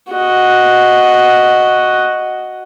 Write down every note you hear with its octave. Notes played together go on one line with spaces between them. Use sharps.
F#4 D#5